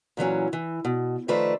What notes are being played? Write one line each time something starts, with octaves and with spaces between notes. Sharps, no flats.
A#2 E3 F#3 C#4
E3
B2
D#3 F3 A3 B4 C5 D5